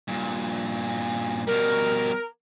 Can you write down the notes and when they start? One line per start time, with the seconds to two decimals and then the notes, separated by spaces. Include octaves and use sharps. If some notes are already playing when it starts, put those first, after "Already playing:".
0.08 G2 A#2
1.47 B2 G3 A#4